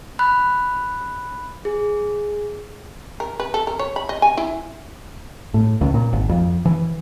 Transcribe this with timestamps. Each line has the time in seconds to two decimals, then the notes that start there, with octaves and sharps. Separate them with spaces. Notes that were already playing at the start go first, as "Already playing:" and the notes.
0.19 B5 F#6
1.65 G#4
3.20 A#4
3.40 B4
3.54 A4
3.67 A#4
3.79 C#5
3.96 B5
4.09 D#5
4.22 G#5
4.37 E4
5.54 A2
5.81 C#2
5.94 A#2
6.13 G#1
6.29 F2
6.65 E3